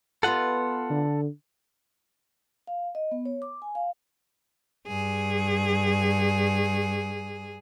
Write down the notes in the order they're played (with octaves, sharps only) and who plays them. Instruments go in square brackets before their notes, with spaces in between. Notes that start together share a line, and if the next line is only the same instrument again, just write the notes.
[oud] B3 F4 D#5 [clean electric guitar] A4 F#5
[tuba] D3
[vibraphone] F5
D#5
B3
C#5
D6
G#5
F5
[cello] G2 G#4